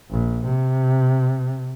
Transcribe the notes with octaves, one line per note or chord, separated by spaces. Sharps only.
A#1
C3